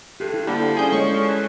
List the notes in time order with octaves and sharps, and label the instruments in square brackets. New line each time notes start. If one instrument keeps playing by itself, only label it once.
[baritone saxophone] G2 [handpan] G4 A4
[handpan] E4
[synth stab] D3 G3 [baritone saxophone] F3 [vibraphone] A#3
[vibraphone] C#4 A4 D5 [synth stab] G#4 G6
[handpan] G#3 C#5 D#5 [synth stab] C#6
[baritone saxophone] E3